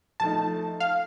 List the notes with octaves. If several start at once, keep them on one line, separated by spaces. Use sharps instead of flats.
F3 A3 D#4 A5
F5